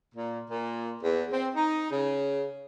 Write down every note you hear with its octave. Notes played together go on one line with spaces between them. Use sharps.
A#2
A#2
E2
C4
D#4
C#3